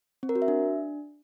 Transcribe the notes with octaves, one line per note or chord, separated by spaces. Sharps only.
C4
A#4
F#4
E5
D4